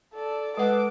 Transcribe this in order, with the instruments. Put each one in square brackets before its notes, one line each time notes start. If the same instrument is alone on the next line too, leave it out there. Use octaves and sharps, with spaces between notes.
[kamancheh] A4 D5
[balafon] G#3 F#5 [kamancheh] A4 D6 [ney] B4